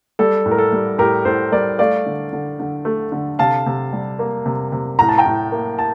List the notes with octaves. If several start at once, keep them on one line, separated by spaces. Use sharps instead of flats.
G3 A4
A2
A#4
A4
G3
A2 G4 A#4
A2 A4 C5
G3 A#4 D5
A3 D5 F5
D3
D3
D3
A3
D3
C3 F5 A5
C3
G3
A#3
C3
C3
A2 A#5
A5
G5 A#5
A2
A#3
A5